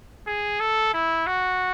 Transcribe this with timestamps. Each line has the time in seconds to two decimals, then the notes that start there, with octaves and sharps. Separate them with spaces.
0.27 G#4
0.60 A4
0.93 E4
1.27 F#4